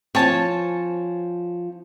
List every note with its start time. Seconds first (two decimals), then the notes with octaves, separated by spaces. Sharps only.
0.15 F3 C4 C#5 G#5 A5